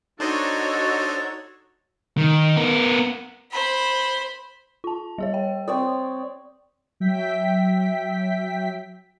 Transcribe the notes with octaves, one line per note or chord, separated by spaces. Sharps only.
D4 D#4 F#4 A4 C5 C#5 D#5
D#3
B3 A#4
C5 B5
F4 A5
G3 G#4 C#5
G5
C4 C#5 D5 D#6
F#3 E5 G5 B6